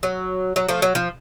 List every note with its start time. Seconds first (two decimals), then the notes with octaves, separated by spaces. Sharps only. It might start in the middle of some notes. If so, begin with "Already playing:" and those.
0.03 F#3
0.56 F#3
0.69 F3 A3
0.82 F#3
0.95 F3